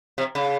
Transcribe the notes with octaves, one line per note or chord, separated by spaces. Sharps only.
C3
C#3